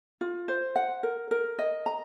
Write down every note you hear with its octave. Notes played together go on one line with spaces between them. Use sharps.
F4
C5
F#5
A#4
A#4
D#5
A#5